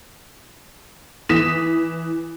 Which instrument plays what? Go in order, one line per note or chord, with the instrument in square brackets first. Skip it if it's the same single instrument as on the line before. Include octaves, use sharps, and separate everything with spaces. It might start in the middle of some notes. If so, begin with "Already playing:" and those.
[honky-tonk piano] E3 D#6 B6 E7